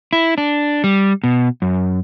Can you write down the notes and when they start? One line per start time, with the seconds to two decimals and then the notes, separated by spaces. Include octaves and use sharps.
0.13 E4
0.38 D4
0.84 G3
1.24 B2
1.62 F#2